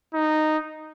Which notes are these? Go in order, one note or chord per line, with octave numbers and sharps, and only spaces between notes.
D#4